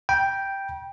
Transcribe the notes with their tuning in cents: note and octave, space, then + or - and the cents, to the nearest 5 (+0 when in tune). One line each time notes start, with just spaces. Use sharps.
G5 +0 B5 -40